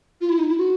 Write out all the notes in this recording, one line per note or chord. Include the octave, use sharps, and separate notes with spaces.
F4
E4
D#4
E4
F#4